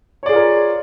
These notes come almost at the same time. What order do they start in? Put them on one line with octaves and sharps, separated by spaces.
C#5 D5 G#4 F4 A#4